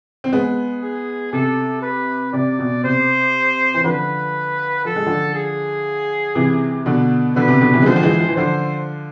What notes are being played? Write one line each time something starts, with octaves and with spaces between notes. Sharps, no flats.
C4
G#3 B3
G#4
C3 A4
B4
C3 D5
B2
C3 C5
E3
D3 F3 B4
F3 A4
G#3
D3 F3
G#4
C3 E3
B2 D3
B2 D3 B4
C3
B2 D3
C3 E3
G#3
D3 F3 C5
F3
E3 G#3
F3
E3
D3 F3 C5